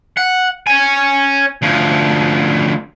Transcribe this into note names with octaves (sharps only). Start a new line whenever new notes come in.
F#5
C#5 G#5
D2 F3